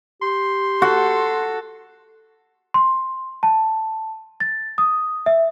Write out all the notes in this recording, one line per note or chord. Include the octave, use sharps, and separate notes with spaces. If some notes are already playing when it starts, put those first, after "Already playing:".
G4 C6
F#4 A4
C6
A5
A6
D#6
E5